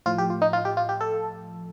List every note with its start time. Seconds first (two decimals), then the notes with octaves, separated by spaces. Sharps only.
0.06 A2 F3 F4
0.18 G4
0.30 F4
0.42 D#4
0.53 F4
0.65 G4
0.77 F4
0.89 G4
1.01 A4